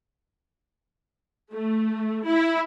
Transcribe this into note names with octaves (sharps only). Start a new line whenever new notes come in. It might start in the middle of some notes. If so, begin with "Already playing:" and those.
A3
E4